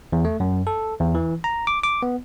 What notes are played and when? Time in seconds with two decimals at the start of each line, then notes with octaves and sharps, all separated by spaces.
0.13 E2
0.25 A3
0.40 F#2
0.67 A4
1.00 E2
1.15 E3
1.44 A#5
1.67 D6
1.84 D6
2.02 B3